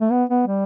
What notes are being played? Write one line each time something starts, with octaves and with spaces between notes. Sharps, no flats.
A3
B3
B3
G3